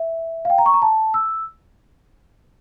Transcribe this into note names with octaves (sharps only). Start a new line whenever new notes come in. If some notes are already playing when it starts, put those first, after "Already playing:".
Already playing: E5
F5
G5
A#5
C#6
A#5
A5
E6